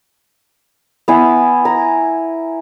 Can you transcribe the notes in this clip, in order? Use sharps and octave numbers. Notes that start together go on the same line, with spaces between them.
B3 E4 G#5
G#5 A#5